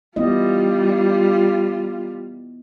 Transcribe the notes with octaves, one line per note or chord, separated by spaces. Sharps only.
G3 B3 E4 F4 D#5